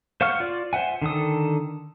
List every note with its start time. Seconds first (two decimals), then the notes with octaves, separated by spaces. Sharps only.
0.21 C5 F5 F#5 C#6 F6
0.40 F4 D5
0.73 C5 E5 F#5 G#5
1.02 D3 D#3 A4 D#6